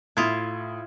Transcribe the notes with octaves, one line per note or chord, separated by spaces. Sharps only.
A2 E4 F4 D#6 G#6